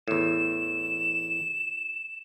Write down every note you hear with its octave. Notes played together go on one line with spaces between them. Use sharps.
E2 A2 E7